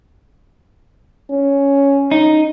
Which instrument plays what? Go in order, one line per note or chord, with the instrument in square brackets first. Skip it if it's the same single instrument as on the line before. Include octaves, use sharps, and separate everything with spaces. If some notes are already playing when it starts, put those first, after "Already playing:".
[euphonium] C#4
[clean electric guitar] D#4